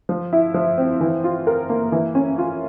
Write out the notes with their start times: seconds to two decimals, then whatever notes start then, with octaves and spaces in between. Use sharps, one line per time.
0.09 F3
0.33 E4
0.54 F3
0.78 C4
1.00 E3
1.24 F4
1.47 A#4
1.69 A#3
1.92 E3
2.15 C#4
2.38 F4